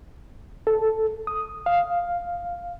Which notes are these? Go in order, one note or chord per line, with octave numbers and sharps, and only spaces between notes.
A4
D#6
F5